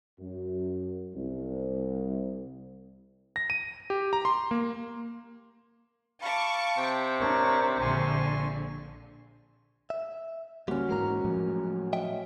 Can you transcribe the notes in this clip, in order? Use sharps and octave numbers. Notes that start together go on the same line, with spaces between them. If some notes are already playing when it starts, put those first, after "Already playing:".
F#2
C2
A#6
D#7
G4
A#5
C6
A#3
F5 A5 B5 C#6 D6
C3 G5
D4 A#4 C#5 C#6
A#1 D3 G#5 C6 C#6
E5
D2 G2 G3 A#3 C#4 F#4
G#2 E3 G#3 A#4 A#5
A2 F3 F#3
D#5 E5 G5